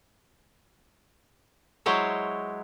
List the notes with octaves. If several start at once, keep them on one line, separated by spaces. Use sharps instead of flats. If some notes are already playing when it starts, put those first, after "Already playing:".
F#3 G#3 E4 C5 C#5